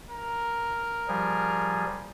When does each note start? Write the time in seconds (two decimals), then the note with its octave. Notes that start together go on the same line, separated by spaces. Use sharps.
0.10 A#4
1.08 F3 G3 G#4